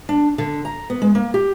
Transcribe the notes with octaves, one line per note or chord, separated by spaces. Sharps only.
D4
D3
A#5
B3
G#3
A#3
G4